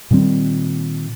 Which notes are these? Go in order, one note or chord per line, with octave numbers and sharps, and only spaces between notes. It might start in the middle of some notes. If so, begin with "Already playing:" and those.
A#2 D#3 G3 C4